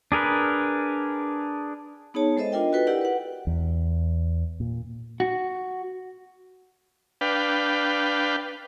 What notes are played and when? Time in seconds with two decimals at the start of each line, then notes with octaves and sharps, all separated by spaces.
0.12 D4 G#4 A#4 B4
2.14 B3 D#4 G#4 C#5 A5
2.37 G#3 A4 C5 D#5 E5
2.52 D4 F4 A#4 D#5 G5
2.72 F4 F#4 A4 B4 G5
2.87 E4 G4 A#4 D5 F#5
3.01 B4 F#5
3.47 E2
4.60 A#2
5.20 F#4
7.21 D4 B4 F5 G5